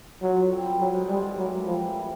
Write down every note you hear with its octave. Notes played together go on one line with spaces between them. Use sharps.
F#3 F4
D3
C4
G3
F#3 C4
G#2
G3 G#3
E3
F#3 A#3
A2
F3 G3
E3
G3